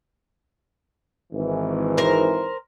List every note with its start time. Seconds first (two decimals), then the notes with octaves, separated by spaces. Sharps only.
1.32 G#1 E3
1.97 A#4 C5